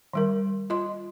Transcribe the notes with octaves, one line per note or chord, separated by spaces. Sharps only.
D#3 G3 A#4
F4 D#5 C6